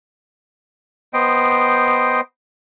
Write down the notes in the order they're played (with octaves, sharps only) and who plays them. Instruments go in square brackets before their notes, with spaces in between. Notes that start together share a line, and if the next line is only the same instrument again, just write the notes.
[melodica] B3 C5 D#5 G5